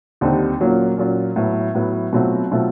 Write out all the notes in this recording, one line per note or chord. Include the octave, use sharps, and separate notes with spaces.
D#2 D3 G3 C4 D#4
A#2 F#3 A#3 C#4 F4
A#2 F#3 A#3 C#4 F4
A2 F#3 B3
A2 F#3 B3
B2 F#3 A3 C4 F4
B2 F#3 A3 C4 F4